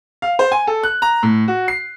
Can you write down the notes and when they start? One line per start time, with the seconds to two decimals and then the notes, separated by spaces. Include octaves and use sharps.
0.22 F5
0.39 C5
0.52 G#5
0.67 A4
0.83 F#6
1.02 A#5
1.23 A2
1.48 F#4
1.68 C7